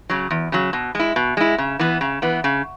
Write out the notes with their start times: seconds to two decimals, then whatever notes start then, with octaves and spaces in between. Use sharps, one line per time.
0.09 C#3 F#3
0.31 E2
0.52 C#3 F#3
0.73 B2
0.95 G#3 E4
1.16 B2
1.37 G#3 E4
1.58 C#3
1.79 E3 B3
2.01 C#3
2.22 E3 B3
2.44 C#3